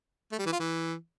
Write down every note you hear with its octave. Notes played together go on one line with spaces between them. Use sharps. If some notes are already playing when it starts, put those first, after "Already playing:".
A3
G3
E3
F4
E3